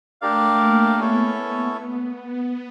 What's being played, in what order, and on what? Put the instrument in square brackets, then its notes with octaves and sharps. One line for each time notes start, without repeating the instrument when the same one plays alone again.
[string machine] A3 [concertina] D4 G4 A#4 D5 F5
[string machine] A#3
[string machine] B3 [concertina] C#4 E4 A4 C#5